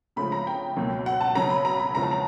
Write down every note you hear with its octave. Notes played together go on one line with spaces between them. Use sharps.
D2 C#3 F3 G#3 B5
A#5
G5
C#2 B2 F#3 A#3
F#5
A5
C#3 F#3 B3 A#5
B5
A#5
B5
E2 C#3 F3 G#3 B3 A#5
A5
A#5